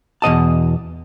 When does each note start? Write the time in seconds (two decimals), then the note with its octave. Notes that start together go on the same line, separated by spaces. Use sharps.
0.22 E2 B2 D#5 A5